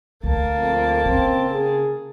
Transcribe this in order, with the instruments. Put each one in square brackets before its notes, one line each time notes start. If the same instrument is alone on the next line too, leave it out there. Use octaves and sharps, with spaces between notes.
[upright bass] D2 [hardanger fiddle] A#3 A5
[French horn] F2
[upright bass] C#3 [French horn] C4
[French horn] G#4